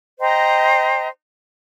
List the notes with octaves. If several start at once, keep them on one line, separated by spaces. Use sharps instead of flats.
C5 D#5 G5 A#5